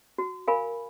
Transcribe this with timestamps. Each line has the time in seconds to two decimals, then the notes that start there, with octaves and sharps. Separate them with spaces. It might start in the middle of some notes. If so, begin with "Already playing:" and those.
0.18 F#4
0.48 A#4 F5 G#5 B5